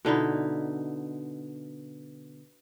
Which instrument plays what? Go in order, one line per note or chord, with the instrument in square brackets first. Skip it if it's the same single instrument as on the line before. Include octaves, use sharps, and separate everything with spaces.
[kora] B2 D3 D#4 E4